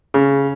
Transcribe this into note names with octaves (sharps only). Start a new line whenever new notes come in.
C#3